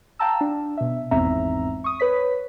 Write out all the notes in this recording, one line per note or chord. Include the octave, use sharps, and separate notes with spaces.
F5 G5 A5 A#5 E6
D4
B2 E5
G#1 E2 G#2 C4 E5 A#5
C#6 D#6
B4 C#5 B6